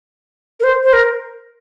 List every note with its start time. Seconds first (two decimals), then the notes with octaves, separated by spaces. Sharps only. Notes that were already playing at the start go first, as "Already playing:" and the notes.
0.60 A#4
0.64 C5
0.83 C5
0.93 A#4